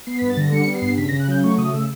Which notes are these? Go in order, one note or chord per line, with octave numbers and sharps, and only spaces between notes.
B3 C7
G2 B6
A6
D3 A#6
G3 C#7
B3
C7
G2
C#3 B6
A#6
C#3
F#6
F#3 G6
A3 C#6
C#3 D#6
C#3 E6